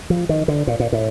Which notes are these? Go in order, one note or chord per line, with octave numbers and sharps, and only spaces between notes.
F3
D#3
D3
A#2
A#2
A2